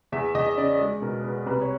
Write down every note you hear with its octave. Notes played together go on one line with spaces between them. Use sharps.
E2 E5
E2 D#5
C#3 D5
G#3
B2 A#4
B3 B4
C2 B4
C#5